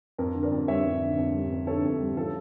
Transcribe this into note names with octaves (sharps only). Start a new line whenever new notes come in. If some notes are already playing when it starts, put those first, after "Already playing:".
F2 A#4
D3
A#4 D5
F2
G3 C#5 E5
F2
D3
F2
G3
F2
D3 A4 C#5
F2
G3
F3 A4